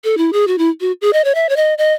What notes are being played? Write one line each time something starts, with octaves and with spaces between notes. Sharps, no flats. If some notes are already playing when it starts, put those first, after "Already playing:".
A4
E4
G#4
F#4
E4
F#4
G#4
D#5
C#5
E5
C#5
D#5
D#5